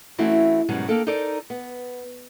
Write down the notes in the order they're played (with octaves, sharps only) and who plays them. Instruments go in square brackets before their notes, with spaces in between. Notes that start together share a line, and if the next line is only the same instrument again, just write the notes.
[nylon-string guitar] E3 A3 C4 C#4 E4 F#4
G#2 B2 D#3 F#3 G3 C#4
A#3 D4 A4 G5
D#4 A4 A#4 C5 D5
B3